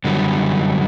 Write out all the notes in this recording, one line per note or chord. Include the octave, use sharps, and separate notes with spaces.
F#2 D3 F#3 G3